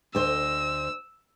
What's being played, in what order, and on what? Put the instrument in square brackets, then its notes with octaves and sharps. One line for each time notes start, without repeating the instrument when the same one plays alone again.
[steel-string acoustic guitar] D2 C5 D#5 [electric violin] E6